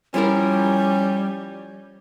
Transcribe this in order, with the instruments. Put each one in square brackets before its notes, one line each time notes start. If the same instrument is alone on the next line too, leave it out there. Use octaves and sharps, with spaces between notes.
[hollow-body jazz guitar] F3 E4 A#4 [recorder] G3 [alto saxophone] C#4